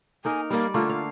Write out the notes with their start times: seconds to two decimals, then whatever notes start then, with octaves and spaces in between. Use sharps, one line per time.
0.25 A#3 D#4 A#4 G#5
0.50 G3 A#3 D5
0.74 D3 A3 A#3 F4
0.89 F5